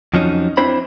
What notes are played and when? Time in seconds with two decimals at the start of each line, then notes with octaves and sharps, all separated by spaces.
0.14 F2 F3 F#3 C#4 D#4
0.57 C4 D4 E4 C5 B5